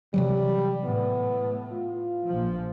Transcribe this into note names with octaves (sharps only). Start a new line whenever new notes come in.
C3 E3 F#3 G3
A2 B3
F4
A#1 F3